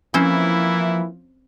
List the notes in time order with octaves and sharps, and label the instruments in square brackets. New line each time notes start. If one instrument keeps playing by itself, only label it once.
[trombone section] E3 A#3 E4 [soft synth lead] F3 [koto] C4 C#4 C5